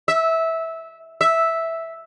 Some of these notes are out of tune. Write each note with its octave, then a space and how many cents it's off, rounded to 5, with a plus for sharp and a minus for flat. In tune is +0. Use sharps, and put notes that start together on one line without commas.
E5 -15
E5 -5